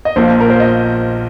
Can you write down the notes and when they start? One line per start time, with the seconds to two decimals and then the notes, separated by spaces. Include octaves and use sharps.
0.05 D#5
0.16 A#1 A#2 F3 C5
0.40 A#4
0.50 C5
0.60 D#5